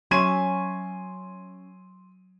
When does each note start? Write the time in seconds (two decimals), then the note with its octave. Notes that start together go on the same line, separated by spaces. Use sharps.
0.11 F#3 C#4 E5 C6 G#6 D#7